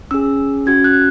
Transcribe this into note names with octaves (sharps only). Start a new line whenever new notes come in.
C#4 G#4 E6
C#4 F#4 G#6
F#6